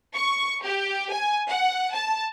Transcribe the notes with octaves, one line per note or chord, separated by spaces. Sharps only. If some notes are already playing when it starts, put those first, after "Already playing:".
C#6
G4
G#5
F#5
A5